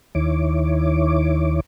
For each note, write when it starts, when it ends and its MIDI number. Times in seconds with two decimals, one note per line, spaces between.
0.15 1.60 39
0.15 1.60 51
0.15 1.60 64
0.15 1.60 73
0.15 1.60 86